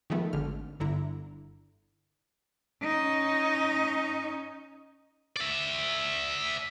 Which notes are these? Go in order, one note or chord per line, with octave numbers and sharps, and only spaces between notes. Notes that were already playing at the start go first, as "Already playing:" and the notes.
D#3 F3 G#3 A3 B3
G#1 D3 F6
G1 D3 E4 A#5
C#4 D#4
D5 E5